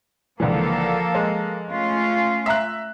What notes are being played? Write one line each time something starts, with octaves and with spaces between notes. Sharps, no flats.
C#2 D3 E3 F3 A#3 A4
G#3
A3 C#4 F4
E5 A#5 F#6